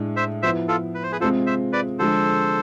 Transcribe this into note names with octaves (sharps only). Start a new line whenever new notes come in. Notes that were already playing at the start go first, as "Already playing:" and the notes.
Already playing: A2 G#3 D4
C5 E5
F3 B3 E4 C5 E5
F4 A4
B4
C5
G#4 B4
C3 G#3 C4 F4 A4 C5
C5 E5
B4 D5
D3 F3 G#3 A4 C5